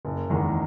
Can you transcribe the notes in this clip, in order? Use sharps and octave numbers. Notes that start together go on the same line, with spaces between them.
F#1
E2 D#3 G#3